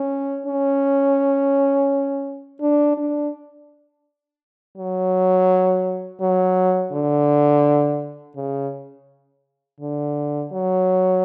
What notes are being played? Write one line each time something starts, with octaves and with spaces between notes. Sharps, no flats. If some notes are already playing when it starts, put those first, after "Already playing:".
Already playing: C#4
C#4
D4
D4
F#3
F#3
D3
C#3
D3
F#3